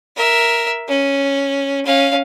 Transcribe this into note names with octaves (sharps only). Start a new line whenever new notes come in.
A#4 E5
C#4
C#4 F5